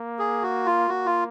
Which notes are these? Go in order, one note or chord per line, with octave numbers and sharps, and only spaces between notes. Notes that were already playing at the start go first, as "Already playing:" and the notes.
Already playing: A#3
G#4
F#4
F4
A#3 F#4
F4